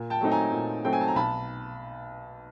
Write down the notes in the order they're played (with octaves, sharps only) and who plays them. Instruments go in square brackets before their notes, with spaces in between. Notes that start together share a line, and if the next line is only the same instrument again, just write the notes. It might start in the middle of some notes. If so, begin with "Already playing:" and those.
Already playing: [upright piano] A#2
G5 A5
F#3 A3 C4 D#4
G#5 A#5
A#2
F#3 A3 C4 D#4 G5
G#5
A5
A#5
B1 A5 B5